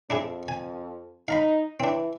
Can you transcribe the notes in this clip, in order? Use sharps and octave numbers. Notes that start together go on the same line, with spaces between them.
F2 D4 E4 G#4
G#5
D#4 F5 A#5 B5
E3 C4 D4